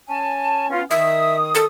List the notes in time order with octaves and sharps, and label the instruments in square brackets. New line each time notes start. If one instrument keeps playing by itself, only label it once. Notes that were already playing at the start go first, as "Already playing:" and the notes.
[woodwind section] C#4 G#5 A5
B3 C#4 F4
[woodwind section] D#3 D#6 [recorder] E5
[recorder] A4